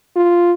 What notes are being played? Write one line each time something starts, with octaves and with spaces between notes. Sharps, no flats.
F4